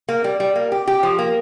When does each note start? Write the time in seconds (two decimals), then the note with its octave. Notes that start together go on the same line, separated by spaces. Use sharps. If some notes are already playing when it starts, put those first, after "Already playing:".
0.09 A#3
0.24 G3
0.40 G3
0.56 A#3
0.72 G4
0.87 G4
1.03 F3
1.19 A#3